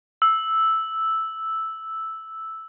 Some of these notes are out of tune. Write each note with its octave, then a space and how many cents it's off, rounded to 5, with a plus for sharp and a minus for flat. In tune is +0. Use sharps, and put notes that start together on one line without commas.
E6 -5